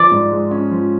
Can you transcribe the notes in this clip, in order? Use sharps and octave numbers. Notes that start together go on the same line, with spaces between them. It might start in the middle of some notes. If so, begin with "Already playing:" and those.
Already playing: F3 D5
G#2
G#3
C#4
F3